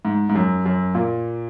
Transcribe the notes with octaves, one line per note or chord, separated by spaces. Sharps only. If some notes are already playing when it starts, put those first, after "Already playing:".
G#2
G#2
F#2
F#2
A#2